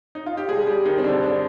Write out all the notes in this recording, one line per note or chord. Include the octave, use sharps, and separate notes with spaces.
D#4
F4
G4
B2 G3 G#3 G#4
G3 G4
D#3 D#4
C4
B2 D3 G3 D4
D3 D4